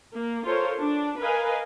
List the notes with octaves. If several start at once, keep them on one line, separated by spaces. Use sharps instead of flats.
A#3
F4 A4 A#4 C5 C#5
D4
A#4 B4 D#5 F5 G#5